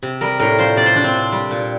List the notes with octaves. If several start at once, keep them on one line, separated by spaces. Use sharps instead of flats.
C3
G3 A#4
A2 A#4
F3 C5
C3 D5
C5
F3 D4
C4
C3
G3
A#2